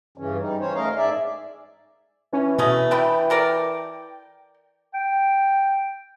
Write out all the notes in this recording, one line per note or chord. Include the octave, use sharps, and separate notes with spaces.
G2 C#3 E3 C#4
G3 D#4
E3 C#4 C5 C#5
A3 C#4 A#4 D#5 F5 A#5
G#2 G#4 D5 E5
E3 C#4
B2 A3 C#4 D#5
D4 E4 B4 G5
A4 A#4 D5
G5